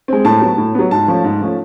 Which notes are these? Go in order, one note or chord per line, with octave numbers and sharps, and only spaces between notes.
G#3 C4
A2 A5
F#3 B3
A2
F#3 B3
G#2 A5
F3 A3 C#4
G#2
F3 A3 C#4